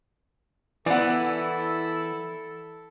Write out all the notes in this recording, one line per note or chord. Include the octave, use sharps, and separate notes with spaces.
E3 B3 E4 A4 D5 F#5